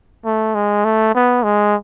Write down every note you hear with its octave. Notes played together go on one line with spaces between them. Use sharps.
A3
G#3
A3
B3
G#3